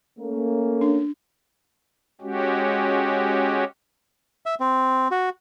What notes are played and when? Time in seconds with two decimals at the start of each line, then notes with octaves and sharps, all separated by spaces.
0.19 A3 A#3 C#4
0.81 D4
2.21 G#3 C#4 F#4 G4
4.46 E5
4.60 C4
5.11 F#4